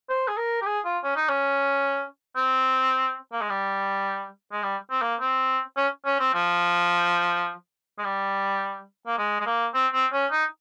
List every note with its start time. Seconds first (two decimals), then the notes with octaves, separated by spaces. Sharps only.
0.10 C5
0.28 G#4
0.37 A#4
0.62 G4
0.66 G#4
0.85 F4
1.04 C#4
1.16 D#4
1.29 C#4
2.36 C4
3.32 A#3
3.41 G#3
3.50 G3
4.52 G#3
4.63 G3
4.91 C4
5.02 A#3
5.20 C4
5.77 C#4
6.06 C#4
6.19 C4
6.34 F3
7.98 G#3
8.04 G3
9.07 A#3
9.18 G#3
9.40 G#3
9.46 A#3
9.74 C4
9.93 C4
10.13 C#4
10.31 D#4